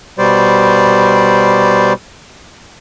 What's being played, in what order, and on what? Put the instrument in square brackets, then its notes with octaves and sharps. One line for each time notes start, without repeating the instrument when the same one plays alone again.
[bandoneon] B2 G3 C5 D5